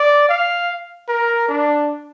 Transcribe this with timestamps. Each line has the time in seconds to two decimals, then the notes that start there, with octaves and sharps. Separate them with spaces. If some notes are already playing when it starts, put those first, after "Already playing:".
Already playing: D5
0.29 F5
1.09 A#4
1.49 D4